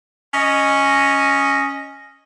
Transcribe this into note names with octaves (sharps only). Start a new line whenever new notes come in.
C#4 D#5